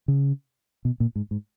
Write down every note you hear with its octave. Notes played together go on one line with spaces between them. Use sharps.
C#3
B2
A#2
G#2
G#2